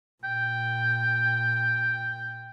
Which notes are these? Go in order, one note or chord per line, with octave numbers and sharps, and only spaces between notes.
A#2 G5